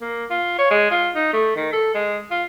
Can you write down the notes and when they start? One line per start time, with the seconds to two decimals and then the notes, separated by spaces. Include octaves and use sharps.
0.01 A#3
0.30 F4
0.59 C#5
0.71 G#3
0.91 F4
1.15 D#4
1.33 A3
1.56 D#3
1.73 A4
1.95 G#3
2.31 F4